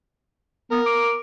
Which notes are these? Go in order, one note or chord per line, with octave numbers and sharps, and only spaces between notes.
B3 A#4
D6